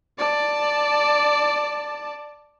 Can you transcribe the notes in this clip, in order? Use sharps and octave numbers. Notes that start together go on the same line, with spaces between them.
D5 A5